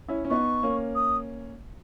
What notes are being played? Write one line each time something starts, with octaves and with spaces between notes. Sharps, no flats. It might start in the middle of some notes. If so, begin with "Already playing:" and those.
C#4 E4
C#4
B3 D#4 C#6
A#3 C#4
D#6